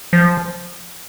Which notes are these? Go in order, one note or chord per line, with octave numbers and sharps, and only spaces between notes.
F3